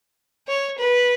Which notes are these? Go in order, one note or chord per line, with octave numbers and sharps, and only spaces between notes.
C#5
B4